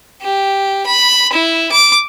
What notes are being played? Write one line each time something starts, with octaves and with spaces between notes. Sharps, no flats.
G4
B5
E4
D6